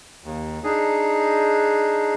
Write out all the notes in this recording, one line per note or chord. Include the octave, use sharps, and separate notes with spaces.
D#2
D4 D#4 G#4